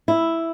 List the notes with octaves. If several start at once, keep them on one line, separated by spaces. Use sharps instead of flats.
E4